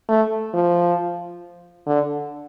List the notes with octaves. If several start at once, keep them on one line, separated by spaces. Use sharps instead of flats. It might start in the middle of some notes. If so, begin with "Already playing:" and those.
A3
F3
D3